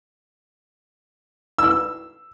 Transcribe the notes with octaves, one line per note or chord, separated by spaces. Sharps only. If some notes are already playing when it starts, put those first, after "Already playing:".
E6